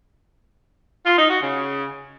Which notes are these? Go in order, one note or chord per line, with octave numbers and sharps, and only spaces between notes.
F4
D#4
F#4
C#3